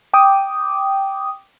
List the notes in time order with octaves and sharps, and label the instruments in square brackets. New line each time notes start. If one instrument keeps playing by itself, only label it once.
[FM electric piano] G5 D6 D#6